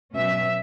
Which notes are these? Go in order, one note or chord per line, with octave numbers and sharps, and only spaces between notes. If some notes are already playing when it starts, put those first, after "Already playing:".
B2 F#3 C#4 E5